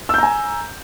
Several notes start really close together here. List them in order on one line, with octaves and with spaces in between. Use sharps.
E6 G6 A#5 G#5